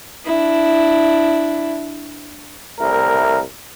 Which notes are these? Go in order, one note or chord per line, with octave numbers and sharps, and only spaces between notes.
D4 E4
C2 A2 A#4